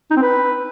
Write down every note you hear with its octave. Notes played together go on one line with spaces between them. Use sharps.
D#4
C4
B4